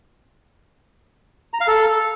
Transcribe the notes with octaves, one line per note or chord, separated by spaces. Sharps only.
A#5
F5
A4